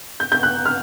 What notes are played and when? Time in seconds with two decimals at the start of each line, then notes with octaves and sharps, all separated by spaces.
0.20 G6
0.32 G6
0.43 F#6
0.65 F6